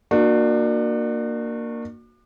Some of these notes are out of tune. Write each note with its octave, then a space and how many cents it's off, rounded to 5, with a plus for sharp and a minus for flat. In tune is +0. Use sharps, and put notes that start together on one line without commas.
A#3 +0 D4 +30 F#4 -20